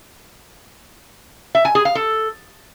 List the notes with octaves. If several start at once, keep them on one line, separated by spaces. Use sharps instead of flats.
E5
G#5
G#4
F5
A4